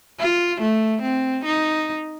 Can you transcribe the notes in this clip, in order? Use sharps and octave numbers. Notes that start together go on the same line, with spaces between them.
F4
A3
C4
D#4